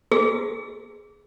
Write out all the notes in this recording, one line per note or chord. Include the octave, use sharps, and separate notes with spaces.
G#4